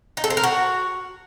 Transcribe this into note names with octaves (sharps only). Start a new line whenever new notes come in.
D#4
A4
C5
A#4
F#4